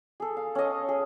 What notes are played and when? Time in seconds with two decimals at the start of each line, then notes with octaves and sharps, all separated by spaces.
0.20 G#4 A4
0.37 F5
0.55 C#4 D#5
0.89 G#4